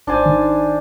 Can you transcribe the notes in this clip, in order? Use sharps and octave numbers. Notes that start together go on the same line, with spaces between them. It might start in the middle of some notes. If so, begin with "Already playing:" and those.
G#1 D4 C5 G#5 A6
D#3